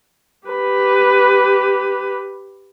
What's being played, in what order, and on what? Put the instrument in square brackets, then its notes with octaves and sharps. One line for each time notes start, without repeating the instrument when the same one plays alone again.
[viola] G4 B4